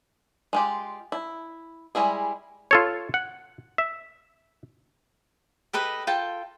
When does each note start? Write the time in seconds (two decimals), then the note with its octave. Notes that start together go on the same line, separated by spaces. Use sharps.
0.53 G#3 F4 G4
1.12 E4
1.95 G3 G#3 E4 G#4
2.71 F4 A4 C#5
3.14 F#5
3.78 E5
5.73 G4 A4 B4 D#5
6.07 F4 A4 G5 A5